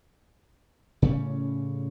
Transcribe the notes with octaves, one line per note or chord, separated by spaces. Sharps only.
A2 C#3 G3 C#4